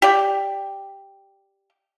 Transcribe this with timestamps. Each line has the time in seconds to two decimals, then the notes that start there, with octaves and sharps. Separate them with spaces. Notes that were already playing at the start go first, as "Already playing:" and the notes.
0.02 G4 D5 G5